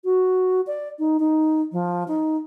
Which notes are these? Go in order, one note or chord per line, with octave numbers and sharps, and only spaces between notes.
F#4
D5
D#4
D#4
F3
D#4